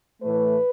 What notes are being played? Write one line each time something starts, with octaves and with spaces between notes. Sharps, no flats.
A2 E3 A3 B4